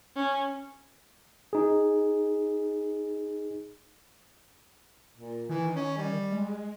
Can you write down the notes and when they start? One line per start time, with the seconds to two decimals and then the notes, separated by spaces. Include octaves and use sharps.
0.16 C#4
1.53 D#4 G#4
5.17 A#2
5.49 D#3 E3
5.76 C#4
5.97 G3
6.32 G#3